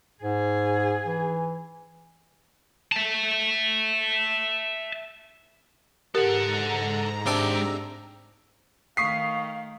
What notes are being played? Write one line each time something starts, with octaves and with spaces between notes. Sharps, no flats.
G#2 G#4
E3
E5 A5
G#2 G4 A4 A#4 F#5 A#5
C3 G#3 D4 A4 G5
D#3 A3 F5 C#6 D#6 B6 C7